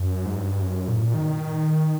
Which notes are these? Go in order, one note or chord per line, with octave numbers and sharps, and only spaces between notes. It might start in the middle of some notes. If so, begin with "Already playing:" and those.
Already playing: F#2
G#2
G2
F#2
A#2
A2
A#2
D#3